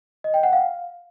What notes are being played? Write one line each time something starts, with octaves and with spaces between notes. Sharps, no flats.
D#5
G5
F#5
F5